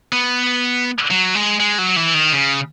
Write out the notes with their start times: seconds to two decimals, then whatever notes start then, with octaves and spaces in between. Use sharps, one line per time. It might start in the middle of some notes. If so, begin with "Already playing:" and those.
0.12 B3
1.11 F#3
1.35 G#3
1.60 G#3
1.78 F#3
1.96 E3
2.14 D#3
2.33 C#3